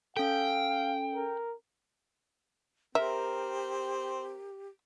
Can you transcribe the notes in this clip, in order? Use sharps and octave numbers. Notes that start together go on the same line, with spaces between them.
C#4 A4 F5 G5
A#4
C4 G4 A#4 E5